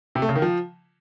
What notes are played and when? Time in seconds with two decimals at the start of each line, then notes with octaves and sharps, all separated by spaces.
0.15 C3
0.22 A3
0.29 C#3
0.36 D#3
0.42 F3